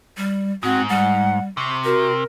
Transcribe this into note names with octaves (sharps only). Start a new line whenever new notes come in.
G3
G#2 C4 F#4
G3 F#5
C3 C#6
F#4 A#4